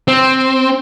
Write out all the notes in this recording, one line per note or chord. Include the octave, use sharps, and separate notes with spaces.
C4